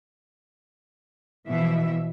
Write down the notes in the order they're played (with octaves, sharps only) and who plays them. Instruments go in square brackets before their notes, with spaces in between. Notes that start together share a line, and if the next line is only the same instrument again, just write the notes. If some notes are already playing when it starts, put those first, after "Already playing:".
[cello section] B2 E3 F3 E5